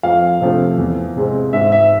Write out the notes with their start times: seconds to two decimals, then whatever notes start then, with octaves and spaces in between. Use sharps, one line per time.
0.03 F2 F5
0.41 C3 F3 A3
0.78 E2
1.16 C3 G#3 C4
1.53 G#2 E5
1.72 E5